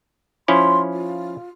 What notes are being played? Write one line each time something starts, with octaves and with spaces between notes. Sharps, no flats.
F3 C#4 E4 C6
F4